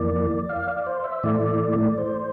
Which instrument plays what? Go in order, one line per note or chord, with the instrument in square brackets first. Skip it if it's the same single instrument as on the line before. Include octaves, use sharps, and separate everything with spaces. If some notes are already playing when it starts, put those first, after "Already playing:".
Already playing: [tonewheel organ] F2 E3 A#3 D5
F5
D5
C5
E5
A2 E3 A3 D5
C5